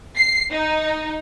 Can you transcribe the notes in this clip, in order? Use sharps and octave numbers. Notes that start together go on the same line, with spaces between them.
C7
D#4